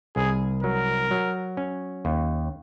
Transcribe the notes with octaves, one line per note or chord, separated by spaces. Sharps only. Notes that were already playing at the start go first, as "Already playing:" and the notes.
C2 G#4
F#3 A#4
F#3
C#4
D#2